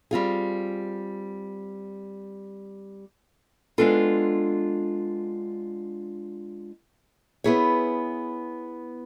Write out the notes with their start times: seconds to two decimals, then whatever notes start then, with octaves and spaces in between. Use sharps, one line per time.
0.11 G3 C4 F4 G#4
3.78 G#3 B3 D4 F4 A4
7.44 B3 E4 G#4 C#5